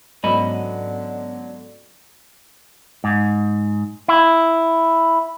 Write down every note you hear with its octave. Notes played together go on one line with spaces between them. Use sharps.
G#2 D3 F#3 B3 C#4 D5 D#5 B5
G#2
E4